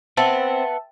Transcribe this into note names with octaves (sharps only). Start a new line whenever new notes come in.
C4 B4 E5 F#5 A5